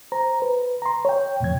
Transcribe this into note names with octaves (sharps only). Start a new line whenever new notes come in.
C5 A#5
B4
A#5 C6
C#5 G5
E2 A2 C3 F3 G#6